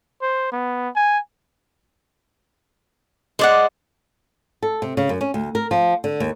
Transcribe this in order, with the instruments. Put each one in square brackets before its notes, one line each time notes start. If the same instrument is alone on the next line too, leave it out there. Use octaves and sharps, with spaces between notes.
[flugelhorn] C5
B3
G#5
[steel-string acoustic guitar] G#3 [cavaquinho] C5 D5 F#5
[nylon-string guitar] A4
C3
C#3
F#2
C#4
D2
A#4
F3
D3
D#2